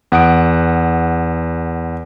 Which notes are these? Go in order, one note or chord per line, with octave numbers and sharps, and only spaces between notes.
E2 F#5 D#6 D7